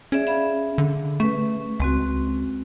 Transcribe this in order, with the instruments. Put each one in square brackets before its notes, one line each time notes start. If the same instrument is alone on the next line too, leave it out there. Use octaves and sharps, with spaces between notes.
[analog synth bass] C#4 [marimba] G#4 D5 E5
[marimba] E5 F5 B5
[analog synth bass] D3
[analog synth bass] A3 [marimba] C#4 B4
[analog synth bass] C#2 [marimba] G#3 C4 F#4